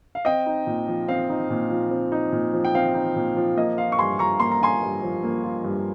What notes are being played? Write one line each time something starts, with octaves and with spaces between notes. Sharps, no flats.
F5
C4 D#5 G5
D#4
A#2
F3
C4 F5
D#4
A#2
F3
C4
D#4
A#2
F3
G5
C4 F5
D#4
A#2
F3
A#3 D#5
F4 F5
C#6
G2 G#5 C6
F3 A#5 C#6
A#3 C6
A#5
F4 G#5 C6
G2
F3
A#3
F4
G2